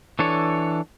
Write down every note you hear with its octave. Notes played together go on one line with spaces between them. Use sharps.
E3 D4 A4 C#5